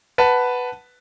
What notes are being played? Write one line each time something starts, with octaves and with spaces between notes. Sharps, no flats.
B4 F#5 A5